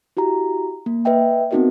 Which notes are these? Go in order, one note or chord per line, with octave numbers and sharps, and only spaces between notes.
E4 F#4 G4 A#5
A#3
B4 D#5 E5 G5
B3 C4 D#4 F#4 A#4 D#5